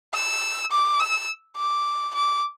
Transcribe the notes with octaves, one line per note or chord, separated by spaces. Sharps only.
E6
D6
E6
D6
D6